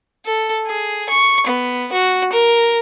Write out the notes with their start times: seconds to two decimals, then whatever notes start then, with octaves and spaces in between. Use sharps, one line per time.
0.26 A4
0.67 G#4
1.10 C#6
1.47 B3
1.92 F#4
2.32 A#4